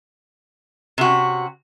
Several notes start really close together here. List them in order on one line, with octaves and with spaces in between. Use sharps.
C3 F#4 C#4